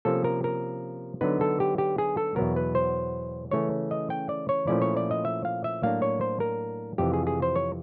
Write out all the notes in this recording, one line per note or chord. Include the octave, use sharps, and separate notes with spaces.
C3 F3 A#3 C#4 A4
A#4
A#4
D3 F#3 B3 D#4 B4
A4
G4
G4
G#4
A4
E2 B2 F#3 B3 A#4
B4
C5
C#3 E3 A3 C#4 C#5
D#5
G5
D5
C#5
A#2 F3 A3 C#4 E4 D5
C#5
D5
D#5
E5
F5
E5
A2 F#3 A#3 D4 F5
C#5
C5
A#4
F2 C3 E3 G4
G#4
G#4
C5
C#5